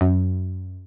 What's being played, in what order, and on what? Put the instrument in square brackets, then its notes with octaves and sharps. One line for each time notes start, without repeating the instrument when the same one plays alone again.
[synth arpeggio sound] F#2